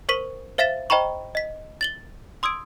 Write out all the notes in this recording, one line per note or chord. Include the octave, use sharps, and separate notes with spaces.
A#4 C5 C#6 B6 D#7 F#7
C5 E5 F5 A6 B6 E7
C5 D#5 G5 A#5 B5 C#6
D#5 B6
A6 F#7 G7
C6 D#6 E6 G#6 D7